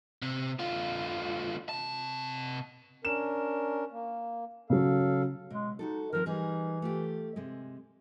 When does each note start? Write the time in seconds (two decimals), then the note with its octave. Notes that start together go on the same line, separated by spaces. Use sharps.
0.22 C3
0.59 D3 F4
1.69 C3 A5
3.05 C#4 D4 A#4 E7
3.92 A#3
4.70 C#3 F#3 A4 F5
5.50 B2 G#3
5.79 D#4 F#4 G4 A4
6.13 D#3 F3 C4 A#4
6.26 E3 G3 D#4 G#4
6.82 A3 F4 G4
7.36 C3 G#3